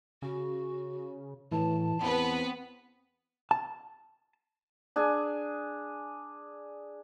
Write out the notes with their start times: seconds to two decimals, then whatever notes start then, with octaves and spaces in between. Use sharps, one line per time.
0.22 C#3 F#4
1.52 A2 E3 A5
2.02 E2 B3 C4 B4
3.51 A5
4.96 D4 G#4 G#5